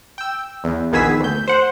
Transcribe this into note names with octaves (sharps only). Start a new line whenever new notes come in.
G5 E6
E2
A#1 D#3 B3 G#4 E6 B6
D2 G6
C5 F#5